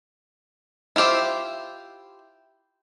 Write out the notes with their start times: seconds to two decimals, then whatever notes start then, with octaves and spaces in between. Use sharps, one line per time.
0.96 E4 F4 G4 C5 E5